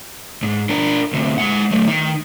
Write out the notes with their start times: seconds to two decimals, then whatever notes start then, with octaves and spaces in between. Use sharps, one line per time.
0.43 G#2
0.70 D4 A#4
1.13 D2 C3
1.38 G#3 F#5
1.71 F#3 A3
1.87 D#3 D#4